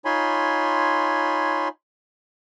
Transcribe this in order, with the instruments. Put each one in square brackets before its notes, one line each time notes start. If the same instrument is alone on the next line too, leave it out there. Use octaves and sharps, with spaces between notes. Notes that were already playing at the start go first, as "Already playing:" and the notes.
[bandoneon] D#4 F4 C#5 G#5 B5 C6